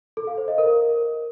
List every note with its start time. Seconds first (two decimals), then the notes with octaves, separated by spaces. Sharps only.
0.17 A4
0.27 F5
0.38 C5
0.48 D#5
0.58 A#4